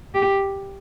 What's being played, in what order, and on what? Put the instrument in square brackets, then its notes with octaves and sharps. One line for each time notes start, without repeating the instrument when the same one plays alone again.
[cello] G4